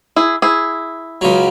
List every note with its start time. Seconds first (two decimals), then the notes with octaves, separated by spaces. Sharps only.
0.16 E4 G#4
0.42 E4 G#4
1.21 C#2 C#3 F#3